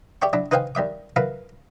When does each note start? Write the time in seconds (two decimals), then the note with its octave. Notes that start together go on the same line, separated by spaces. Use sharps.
0.22 G4 D5 E5 G5 C#6
0.33 F#3 D4 E4
0.51 D#4 B4 C5 F5 G5 G#5
0.75 D#2 G3 E5 D6
1.16 F#3 E4 A#4 B4 F5